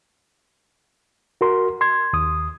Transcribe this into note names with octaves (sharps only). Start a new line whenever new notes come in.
F#4 A#4 C6
C6 G#6
D#2 D#6